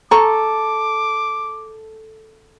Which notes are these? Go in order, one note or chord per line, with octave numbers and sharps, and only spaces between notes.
A4 A#5 C#6 D6